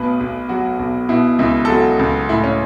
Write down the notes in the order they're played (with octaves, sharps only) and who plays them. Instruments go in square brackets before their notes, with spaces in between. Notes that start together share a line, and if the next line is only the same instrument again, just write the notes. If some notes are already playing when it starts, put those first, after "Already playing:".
Already playing: [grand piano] B1 B2 A3 B4
B1
F#3 F#4
B1
B2 E4
C#2 E4
A4
F#3 F#4
C#2
A2 E4
C#4